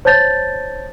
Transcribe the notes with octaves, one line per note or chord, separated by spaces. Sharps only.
C5 C#5 A5 G6 A6